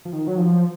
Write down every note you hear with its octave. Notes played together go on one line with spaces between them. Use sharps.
F3
D#3
F#3
F3